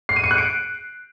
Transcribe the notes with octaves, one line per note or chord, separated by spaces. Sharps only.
C7
D#7
C#7
F#6
D7